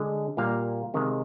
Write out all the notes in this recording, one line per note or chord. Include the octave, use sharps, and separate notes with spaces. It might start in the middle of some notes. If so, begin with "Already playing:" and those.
Already playing: D3 G#3
A#2 G3 A#3 F5
C3 D#3 G#3